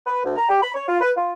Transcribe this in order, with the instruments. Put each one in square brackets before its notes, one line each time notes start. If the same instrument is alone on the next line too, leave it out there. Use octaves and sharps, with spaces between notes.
[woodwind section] B4
D2
A#5
G4
B5
C#5
F4
B4
F4